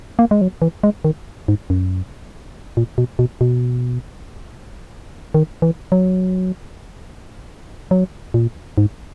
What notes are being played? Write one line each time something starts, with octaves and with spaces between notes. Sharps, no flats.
A#3
G#3
F#3
E3
G#3
D#3
G#2
F#2
A#2
B2
B2
B2
D#3
E3
F#3
F#3
A#2
G#2